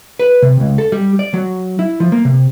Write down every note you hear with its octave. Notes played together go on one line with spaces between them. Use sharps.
B4
C3
C#2
A4
G3
D5
F#3
E4
F3
A#3
C3